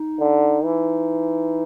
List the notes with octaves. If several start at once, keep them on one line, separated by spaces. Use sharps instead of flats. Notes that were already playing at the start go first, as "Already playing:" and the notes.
Already playing: D#4
D3
E3